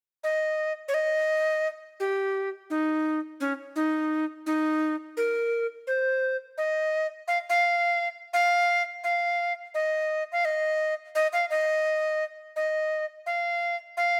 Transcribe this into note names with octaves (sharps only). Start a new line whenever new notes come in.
D#5
C#5
D#5
G4
D#4
C#4
D#4
D#4
A#4
C5
D#5
F5
F5
F5
F5
D#5
F5
D#5
D#5
F5
D#5
D#5
F5
F5